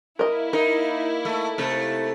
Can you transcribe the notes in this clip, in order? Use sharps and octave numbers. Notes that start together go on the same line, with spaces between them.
A#3 E4 A#4 D#5
D#4 A#4
A3
C3 A3